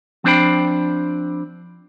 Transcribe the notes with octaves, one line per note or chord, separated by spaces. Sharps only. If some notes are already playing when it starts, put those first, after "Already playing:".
F3 C4 D4 C5 G5 B5